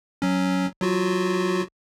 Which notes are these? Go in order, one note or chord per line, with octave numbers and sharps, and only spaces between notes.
F#3 C#4
F#3 F4 F#4